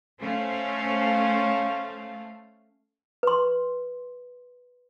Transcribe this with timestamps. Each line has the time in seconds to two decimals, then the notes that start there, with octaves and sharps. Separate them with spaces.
0.21 A3 C#4 C5 F5
3.23 B4 C6